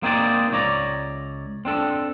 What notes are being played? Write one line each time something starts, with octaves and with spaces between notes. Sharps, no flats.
A#3 C4 D#4 G#4 C5 D5
C#2 C#5 D5 A#5
C4 D4 A4